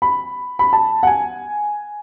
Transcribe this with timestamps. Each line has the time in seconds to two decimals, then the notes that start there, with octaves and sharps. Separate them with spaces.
0.02 B5
0.59 B5
0.73 A5
1.03 F#5
1.07 G#5